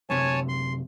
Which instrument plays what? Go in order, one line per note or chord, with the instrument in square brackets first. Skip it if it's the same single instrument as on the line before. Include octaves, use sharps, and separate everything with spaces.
[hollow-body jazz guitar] F#2 C3 [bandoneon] C#5 G#5 A5
[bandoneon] C6